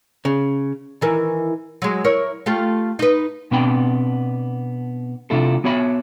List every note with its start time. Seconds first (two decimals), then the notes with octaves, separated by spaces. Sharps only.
0.25 C#3
1.01 D#3 E3 A#4
1.82 F#3 G#3
2.04 E4 A#4 C#5
2.46 A3 F4 G4
2.99 D#4 B4
3.51 B2 B3 C4 D4 G5 B5
5.30 C3 A3 D4 E4 F4 A4
5.64 B3 F#4 C#5 E5 B5